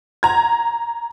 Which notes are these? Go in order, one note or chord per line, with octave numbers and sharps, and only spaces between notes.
A#5 G#6